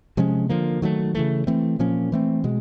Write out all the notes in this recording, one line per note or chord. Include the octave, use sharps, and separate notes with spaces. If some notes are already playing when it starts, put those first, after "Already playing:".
C3 F3 G#3 C#4
D3 F3 A#3
D#3 F#3 A3
C#3 E3 A3
E3 A3 C4
A#2 F3 A#3 C#4
E3 A3 C4
B2 G#3